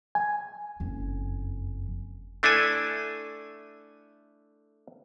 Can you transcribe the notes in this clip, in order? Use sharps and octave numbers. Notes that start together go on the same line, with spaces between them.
G#5
F#1 F2
A3 D4 E4 A4 G#5